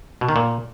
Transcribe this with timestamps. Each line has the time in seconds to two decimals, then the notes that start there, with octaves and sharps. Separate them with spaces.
0.21 B2
0.29 D#3
0.36 A#2